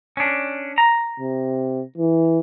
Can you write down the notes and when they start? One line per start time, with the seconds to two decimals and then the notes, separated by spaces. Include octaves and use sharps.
0.17 C#4 D4
0.78 A#5
1.20 C3
1.98 E3